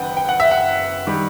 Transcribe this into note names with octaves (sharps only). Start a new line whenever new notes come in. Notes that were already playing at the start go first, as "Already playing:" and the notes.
Already playing: F#1 F#2 D#3 B4 F#5 G5
G5
F#5
E5
F#5
D#3 G3